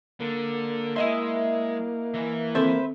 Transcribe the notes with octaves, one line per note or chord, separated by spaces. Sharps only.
D3 A#3
G#3 E4 D#5 E5 C6
E3
D#3 C4 A4 B4 C5 E5